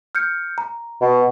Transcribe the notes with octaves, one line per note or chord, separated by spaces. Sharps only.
F6 G6 C#7
A#5
B2